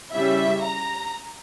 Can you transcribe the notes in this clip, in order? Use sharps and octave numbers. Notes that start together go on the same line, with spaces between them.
C#3 G3 C#4 E4 E5
A#5